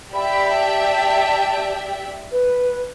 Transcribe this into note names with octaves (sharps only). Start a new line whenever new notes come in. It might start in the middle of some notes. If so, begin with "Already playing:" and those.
G4 D5 E5 B5
A5
B4